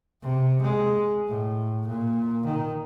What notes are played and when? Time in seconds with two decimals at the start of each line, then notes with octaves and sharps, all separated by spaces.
0.22 C3
0.62 G#3
1.28 A2
1.87 A#2
2.46 D#3